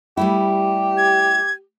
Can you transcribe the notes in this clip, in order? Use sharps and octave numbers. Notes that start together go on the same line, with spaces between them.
G3 A3 E4 G4
G#6